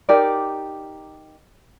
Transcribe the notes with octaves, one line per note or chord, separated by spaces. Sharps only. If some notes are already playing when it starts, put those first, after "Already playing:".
D#4 G4 A#4 D5